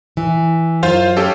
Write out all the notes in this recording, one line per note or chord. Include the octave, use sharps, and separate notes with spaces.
E3
F#2 F4 C5 F5
C#4 G4 A4